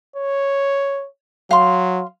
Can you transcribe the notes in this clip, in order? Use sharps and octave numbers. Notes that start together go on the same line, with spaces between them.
C#5
F#3 F5 C6